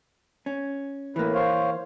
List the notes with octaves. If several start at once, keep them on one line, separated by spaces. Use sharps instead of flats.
C#4
A2 E3 A#3 B4
C5 C#5 F5